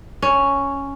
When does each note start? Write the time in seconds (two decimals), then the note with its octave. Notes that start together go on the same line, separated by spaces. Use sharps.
0.22 C#4